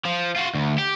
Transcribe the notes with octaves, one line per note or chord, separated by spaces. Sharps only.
F3
F4 F#4
D2
G4